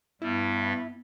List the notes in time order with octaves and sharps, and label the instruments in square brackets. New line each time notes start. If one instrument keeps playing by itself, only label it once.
[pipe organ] G2 G3 [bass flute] B3 [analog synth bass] E4